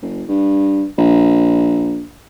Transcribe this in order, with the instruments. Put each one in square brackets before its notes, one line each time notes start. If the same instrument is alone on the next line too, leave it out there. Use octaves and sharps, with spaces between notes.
[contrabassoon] F#1
G2
A#1